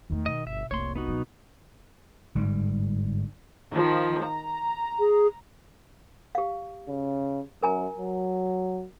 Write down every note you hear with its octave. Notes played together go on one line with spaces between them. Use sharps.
E2 D#3 A3
B2 D#5
G1 E5
F1 C2 A#3 C#5 C6
B3 D#4 F#4
B2 F#3
G1 G#2 G3
D#3 F3
A#5
G#4
G4 F5
C#3
F#2 A#4 G#5 A#5
F#3